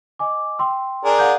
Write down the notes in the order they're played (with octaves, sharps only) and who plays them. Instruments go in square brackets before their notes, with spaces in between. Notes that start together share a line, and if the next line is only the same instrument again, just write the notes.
[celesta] D#5 G#5 D6
G5 C6 E6
[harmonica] D4 G#4 A#4
[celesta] F5 F#5 G6